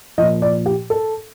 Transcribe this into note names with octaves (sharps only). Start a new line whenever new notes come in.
A#2 F3 D#5
D5
G4
A4